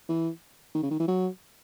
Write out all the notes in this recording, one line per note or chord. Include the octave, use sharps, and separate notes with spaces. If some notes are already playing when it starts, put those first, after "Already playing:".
E3
D#3
C#3
D#3
E3
F#3